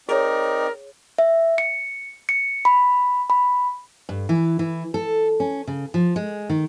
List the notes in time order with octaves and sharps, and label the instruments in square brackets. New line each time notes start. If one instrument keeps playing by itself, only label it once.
[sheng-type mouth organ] C4 D#4 D5 [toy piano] G#4 C#5 [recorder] A#4
[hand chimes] E5
C#7
C#7
B5
B5
[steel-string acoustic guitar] G2
E3
E3
A4
C#4
C#3
F3
G#3
D#3